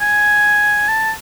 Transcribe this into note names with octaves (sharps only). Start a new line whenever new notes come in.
G#5
A5